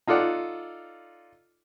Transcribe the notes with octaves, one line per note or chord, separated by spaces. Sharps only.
D#4 F4 A4 D5 F#5